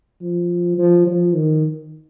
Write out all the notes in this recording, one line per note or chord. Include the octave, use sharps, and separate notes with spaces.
F3
F3
F3
D#3